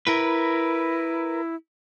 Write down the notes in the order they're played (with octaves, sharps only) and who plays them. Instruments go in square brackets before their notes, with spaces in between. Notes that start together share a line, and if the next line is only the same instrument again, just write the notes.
[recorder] E4 [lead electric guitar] A#4 B4